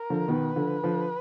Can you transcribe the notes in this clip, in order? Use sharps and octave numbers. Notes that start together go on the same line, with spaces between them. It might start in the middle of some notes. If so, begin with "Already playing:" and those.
Already playing: A#4
D3 F3
B2 D#3 B4
D3 F3
D3 F3